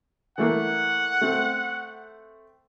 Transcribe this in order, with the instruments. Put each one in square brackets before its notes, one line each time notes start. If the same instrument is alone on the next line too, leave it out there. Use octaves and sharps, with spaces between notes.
[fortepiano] E3 A3 A#3 [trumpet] F#5
[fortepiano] A3 C4